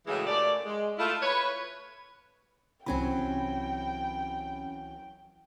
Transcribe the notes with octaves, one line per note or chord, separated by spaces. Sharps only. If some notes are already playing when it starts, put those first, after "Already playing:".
A2 C#3 E3 G#3 E4 F#4
F#2 A3 G4 D5
G#3
A3 E4 F4
B4 C#5
C2 E3 F#3 C4 C#4 G5 B5